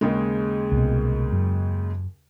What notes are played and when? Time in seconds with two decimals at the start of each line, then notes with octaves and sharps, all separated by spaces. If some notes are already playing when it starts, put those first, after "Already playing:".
0.01 D#2 C#3 G#3
0.72 C2 B2
1.32 F#2